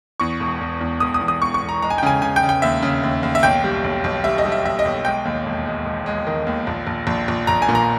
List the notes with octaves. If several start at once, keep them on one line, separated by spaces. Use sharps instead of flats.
E2 C#6
E1
E1
E2
E1 D#6
D#6
E2
D#6
E1 C#6
C#6
E1
A#5
G#3 A#5
G#5
G5
C#3 G#5
C#3 G#5
G5
C#3
G5
D#2 E5
C#3
D#2
D#2
E5
B1 G5
G3
B1
B1
G3 E5
D#5
G3
E5
B1 E5
D#5
B1
G#3 G5
D#2
E1
G#3
E1
G#3
D#3
D#2
A#1
A#1
A#1
A#1
A#1 A#5
G#5
A#2
A#5